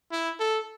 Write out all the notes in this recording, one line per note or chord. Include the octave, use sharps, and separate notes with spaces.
E4
A4